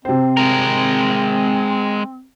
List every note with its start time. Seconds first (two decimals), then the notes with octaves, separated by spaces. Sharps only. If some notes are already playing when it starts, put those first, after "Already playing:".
0.05 C3 C4 C5
0.37 G#3 A#4